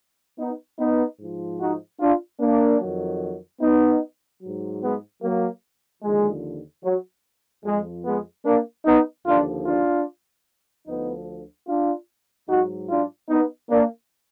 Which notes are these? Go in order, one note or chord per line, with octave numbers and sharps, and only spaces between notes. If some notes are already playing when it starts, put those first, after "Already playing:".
B3 D#4
B3 D#4
G#2 F3
D#4 F#4
D4 F4
A#3 D4
F2 D#3 F#3
B3 D#4
G#2 F#3
G#3 B3
F#3 A#3
D#2 D3 F3 G#3
F#3
F2 F3 G#3
G#3 B3
A#3 D4
B3 D#4
D#2 D3 F3 D4 F4
D4 F4
D2 D3 F3 B3 D#4
D4 F4
G#2 F#3 D#4 F#4
D4 F4
B3 D#4
A#3 D4